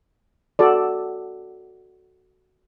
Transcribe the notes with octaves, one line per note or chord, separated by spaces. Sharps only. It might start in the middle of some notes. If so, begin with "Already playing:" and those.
F#4 A4 D5